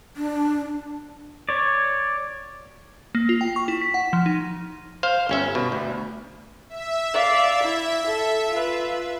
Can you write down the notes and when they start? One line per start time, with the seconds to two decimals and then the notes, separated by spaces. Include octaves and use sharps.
0.17 D4
1.49 C#5 D5
3.15 A#3
3.29 F4
3.41 G5
3.56 C#6
3.68 E4
3.81 B6
3.94 F#5
4.13 F3
4.26 D#4
5.03 C5 F5
5.29 G1 C#4 E5
5.55 B2
5.72 D2
6.69 E5
7.14 D5 F5
7.63 E4
8.07 A4
8.52 F4 B4